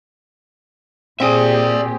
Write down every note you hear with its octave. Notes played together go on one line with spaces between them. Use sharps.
A#2 C4 G4 G#4 D5 E5